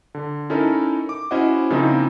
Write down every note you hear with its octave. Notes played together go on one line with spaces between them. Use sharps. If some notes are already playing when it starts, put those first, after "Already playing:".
D3
C#4 D#4 E4 A4 A#4
D6
C#4 E4 F#4 C5 D#5 F#5
C#3 F3 A#3 C4 D#4 E4